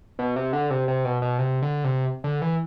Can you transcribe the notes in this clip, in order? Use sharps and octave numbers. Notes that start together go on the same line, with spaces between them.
B2
C3
D3
C3
C3
B2
B2
C3
D3
C3
D3
E3